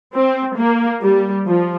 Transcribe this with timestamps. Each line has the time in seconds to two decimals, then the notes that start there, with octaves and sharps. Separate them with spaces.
0.14 C4
0.57 A#3
1.02 G3
1.46 F3